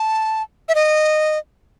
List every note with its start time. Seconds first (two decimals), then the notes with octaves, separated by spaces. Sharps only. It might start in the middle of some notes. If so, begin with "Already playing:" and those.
Already playing: A5
0.69 E5
0.75 D#5